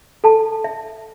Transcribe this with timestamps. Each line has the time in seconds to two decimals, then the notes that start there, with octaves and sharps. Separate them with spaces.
0.24 A4 A5
0.64 E5